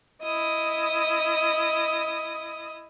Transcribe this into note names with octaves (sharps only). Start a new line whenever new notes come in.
E4 D#5 D#6